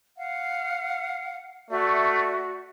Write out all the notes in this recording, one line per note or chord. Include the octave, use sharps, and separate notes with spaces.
F5 F#5
A3 F#4 D5 E5